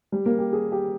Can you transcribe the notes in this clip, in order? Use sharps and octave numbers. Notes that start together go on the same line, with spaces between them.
G3
A#3
G4
G#4
G4